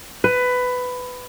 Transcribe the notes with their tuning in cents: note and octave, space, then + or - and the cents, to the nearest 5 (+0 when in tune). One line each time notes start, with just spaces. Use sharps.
B4 +15